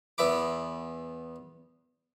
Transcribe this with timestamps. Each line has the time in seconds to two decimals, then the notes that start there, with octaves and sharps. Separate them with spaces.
0.18 E2 B3 E5 B5 D6